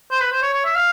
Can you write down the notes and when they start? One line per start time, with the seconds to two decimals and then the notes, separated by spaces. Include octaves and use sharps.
0.11 C5
0.21 B4
0.32 C5
0.42 C#5
0.54 C#5
0.65 E5
0.75 F5